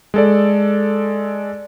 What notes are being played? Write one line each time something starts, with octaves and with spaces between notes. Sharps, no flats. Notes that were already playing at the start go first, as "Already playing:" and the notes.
G#3 A4 D5